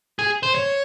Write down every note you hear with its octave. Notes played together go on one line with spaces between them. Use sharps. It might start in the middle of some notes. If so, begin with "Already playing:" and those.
G#4
C5
C#5